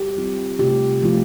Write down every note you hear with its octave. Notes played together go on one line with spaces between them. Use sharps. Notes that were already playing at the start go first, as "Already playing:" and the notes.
Already playing: G4
G3 C4 F4
C3 A3 F4 G4
F3 A3 F4